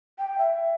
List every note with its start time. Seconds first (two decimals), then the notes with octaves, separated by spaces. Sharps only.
0.18 G5
0.38 E5